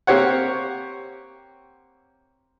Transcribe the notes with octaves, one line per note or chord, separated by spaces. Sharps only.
A#3 C4 G4 C5 C#5 F#5